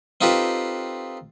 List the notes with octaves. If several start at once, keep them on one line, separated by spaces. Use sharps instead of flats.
C4 D#4 F4 G4 A4 B4